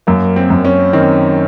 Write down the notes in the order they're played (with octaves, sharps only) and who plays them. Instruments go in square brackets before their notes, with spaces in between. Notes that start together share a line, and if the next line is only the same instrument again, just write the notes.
[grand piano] F#2 A#3
C4
F#2
C#4
D#3 C4